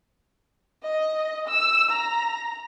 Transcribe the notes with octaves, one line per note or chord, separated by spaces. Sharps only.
D#5
E6
A#5